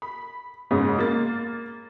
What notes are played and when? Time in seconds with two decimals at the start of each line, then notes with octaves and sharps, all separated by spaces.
0.02 B5
0.71 F#1 G#2 C#3 B3 G#4
0.99 A#3 A6